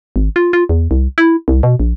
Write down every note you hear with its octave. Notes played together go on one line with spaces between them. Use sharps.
G#1
F4
F4
E2
C2
E4
C2
B2
A#1